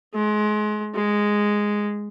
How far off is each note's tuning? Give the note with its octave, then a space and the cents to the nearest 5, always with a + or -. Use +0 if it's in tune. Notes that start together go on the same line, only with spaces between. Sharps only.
G#3 +30
G#3 -5